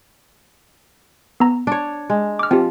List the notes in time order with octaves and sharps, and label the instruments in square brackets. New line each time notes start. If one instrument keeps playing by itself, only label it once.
[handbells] B3 A#5
[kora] D4 C#5
G#3
[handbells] D6 F6
[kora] F3 [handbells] C4 G4